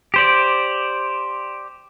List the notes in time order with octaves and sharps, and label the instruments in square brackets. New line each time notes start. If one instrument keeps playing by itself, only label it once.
[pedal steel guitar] G4 C5 D5